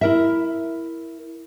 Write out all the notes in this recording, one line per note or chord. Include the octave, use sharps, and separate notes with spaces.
E4 A#4 E5